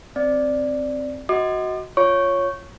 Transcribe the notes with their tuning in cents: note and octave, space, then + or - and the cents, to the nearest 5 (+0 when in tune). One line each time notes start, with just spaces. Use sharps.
C4 +0 D5 +0
F#4 +0 D#5 +25 D6 +40
F4 +0 C#5 +0 C#6 +0